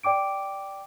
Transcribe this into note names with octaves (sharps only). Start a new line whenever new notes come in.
D5 G5 D6 D7